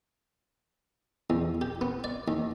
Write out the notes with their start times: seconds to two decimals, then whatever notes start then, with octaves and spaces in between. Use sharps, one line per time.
1.30 E2
1.61 G4
1.81 B3
2.04 D5
2.28 D#2